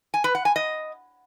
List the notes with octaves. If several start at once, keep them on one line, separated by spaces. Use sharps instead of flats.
G#5
B4
F#5
G#5
D#5